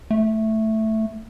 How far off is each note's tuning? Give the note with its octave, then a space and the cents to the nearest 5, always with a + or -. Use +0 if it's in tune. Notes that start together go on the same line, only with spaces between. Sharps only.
A3 +0